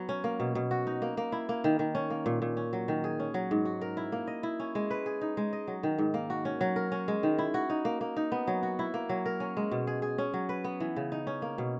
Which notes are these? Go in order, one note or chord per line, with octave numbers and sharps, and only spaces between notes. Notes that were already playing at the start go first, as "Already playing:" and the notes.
Already playing: F#3 B3 F#4
C#4
A#3
B2
B2
F#4
D#4
A#3
A#3
E4
A#3
D#3
D#3
C#4
A#3
A#2
A#2
C#4
F#3
D#3
G#4
C#4
F#3
G#2
F#4
A#4
E4
A#3
D#5
E4
C#4
G#3
B4
G#4
D#4
G#3
D#5
F#3
D#3
G#2
A#3
F#4
C#4
F#3
A#4
C#4
G#3
D#3
E4
F#4
D#4
A#3
A#3
D#4
B3
F#3
F#4
E4
A#3
F#3
A#4
C#4
G#3
B2
G#4
G#4
C#4
F#3
B4
B3
E3
C#3
D#4
C#4
A#3
B2